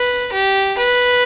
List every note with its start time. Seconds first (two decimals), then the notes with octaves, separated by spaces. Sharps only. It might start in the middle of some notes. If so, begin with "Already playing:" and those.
Already playing: B4
0.33 G4
0.79 B4